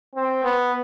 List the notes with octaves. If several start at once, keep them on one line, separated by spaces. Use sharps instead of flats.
C4
B3